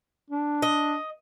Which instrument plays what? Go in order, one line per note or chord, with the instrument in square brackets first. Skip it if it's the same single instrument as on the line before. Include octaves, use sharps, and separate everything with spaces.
[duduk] D4
[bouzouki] D#5